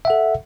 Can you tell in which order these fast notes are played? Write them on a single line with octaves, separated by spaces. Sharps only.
E5 F#5 A4